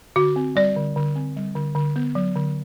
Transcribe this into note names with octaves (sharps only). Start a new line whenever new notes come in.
D3 F#4
C4
G3 D5
D3
D3
C4
G3
D3
D3
B3
F#3
D3